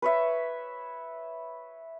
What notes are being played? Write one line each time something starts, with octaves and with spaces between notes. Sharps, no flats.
B4 C#5 E5